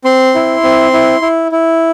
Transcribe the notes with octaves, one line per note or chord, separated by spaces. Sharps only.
C4 C6
E4
C4
E4
E4
E4